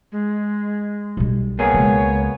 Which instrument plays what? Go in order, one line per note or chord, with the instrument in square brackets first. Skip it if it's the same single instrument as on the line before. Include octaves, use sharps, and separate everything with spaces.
[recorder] G#3
[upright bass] B1 G3
[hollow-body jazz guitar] A#3 B3 G#4 [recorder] C#5
[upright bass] C#2